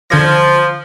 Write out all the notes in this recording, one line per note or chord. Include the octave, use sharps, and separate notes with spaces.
D3 F3 G#6 A#6